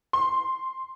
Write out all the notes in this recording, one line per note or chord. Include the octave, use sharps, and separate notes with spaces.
C6